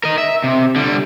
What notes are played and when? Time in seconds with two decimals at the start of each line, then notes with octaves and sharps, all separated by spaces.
0.04 A#4 D#5
0.18 E5
0.44 C3
0.76 D3 G3